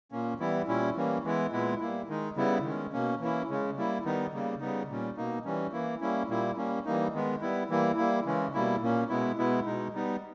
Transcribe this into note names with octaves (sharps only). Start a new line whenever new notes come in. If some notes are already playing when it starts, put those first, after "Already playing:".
A#2 A#3 C#4
E3 G3 B3 E4
A#2 G3 C#4 E4
E3 G3 A#3 C#4
E3 G#3 B3 E4
A#2 G#3 B3 E4
G3 A#3 E4
D#3 G#3 D#4
C#3 G3 B3 E4
D#3 G#3 C#4
B2 A#3 C#4
E3 A#3 C#4 E4
C#3 G#3 C#4
G3 A#3 E4
D#3 G3 B3 D#4
C#3 G3 A#3
C#3 G3 B3 D#4
A#2 G3 C#4
B2 A#3 D#4
E3 G3 C#4
E3 A#3 E4
G3 A#3 C#4 E4
A#2 G3 A#3 E4
G3 A#3 C#4
E3 G3 A#3 D#4
D#3 G#3 B3
G3 B3 E4
E3 G3 A#3 E4
G3 A#3 E4
C#3 E3 G#3 C#4
B2 G3 A#3 E4
A#2 A#3 C#4
B2 G#3 B3 E4
B2 G#3 B3 E4
B2 G#3 D#4
G3 B3 D#4